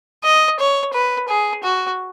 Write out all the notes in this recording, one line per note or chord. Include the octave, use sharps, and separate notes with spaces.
D#5
C#5
B4
G#4
F#4